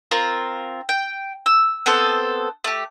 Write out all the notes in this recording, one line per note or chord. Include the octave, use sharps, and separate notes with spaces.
C4 F4 A#4
G5
E6
B3 C4 A4 C5
A3 G4